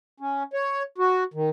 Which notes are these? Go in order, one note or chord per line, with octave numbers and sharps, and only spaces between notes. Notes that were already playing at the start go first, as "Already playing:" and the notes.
C#4
C#5
F#4
D#3